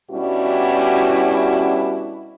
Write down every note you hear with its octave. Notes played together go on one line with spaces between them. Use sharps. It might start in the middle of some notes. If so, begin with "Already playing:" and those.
B2 G3 C#4 D4 E4 F#4